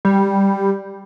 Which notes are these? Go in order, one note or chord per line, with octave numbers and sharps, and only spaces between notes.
G3